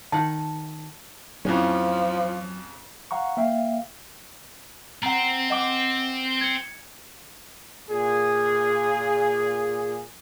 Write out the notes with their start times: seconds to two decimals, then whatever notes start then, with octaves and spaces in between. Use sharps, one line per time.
0.12 D#3 F#5 A5
1.45 F2 A2 F3 F#3 C#4
3.11 F5 F#5 A#5 C#6
3.37 A#3 E5 F5 G5
5.03 C4 F#5 A#5
5.50 D#5 F#5 D6
6.41 G#6 C#7
7.89 A#2 G#4